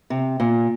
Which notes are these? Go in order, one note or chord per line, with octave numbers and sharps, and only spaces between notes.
C3
A#2